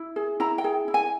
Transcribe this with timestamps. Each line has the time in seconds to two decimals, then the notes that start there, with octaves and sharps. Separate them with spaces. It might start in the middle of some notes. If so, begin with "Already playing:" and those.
Already playing: E4
0.16 G#4
0.40 E4 A#5
0.58 G5
0.64 G#4
0.88 E4
0.94 G#5